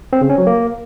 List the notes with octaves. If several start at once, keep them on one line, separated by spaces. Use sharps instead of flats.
C4
C#3
C#4
F#3
A#3